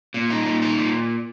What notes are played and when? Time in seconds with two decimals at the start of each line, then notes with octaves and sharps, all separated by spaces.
0.14 A#2
0.30 D#4
0.46 A#2
0.62 D#4
0.78 A#2